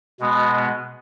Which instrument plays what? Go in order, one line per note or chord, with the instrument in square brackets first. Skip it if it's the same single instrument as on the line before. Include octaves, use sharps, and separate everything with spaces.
[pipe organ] B2 G#3 B3